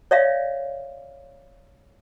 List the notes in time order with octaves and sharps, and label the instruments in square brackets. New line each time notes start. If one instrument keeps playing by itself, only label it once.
[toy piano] C#5 D5 E5 F5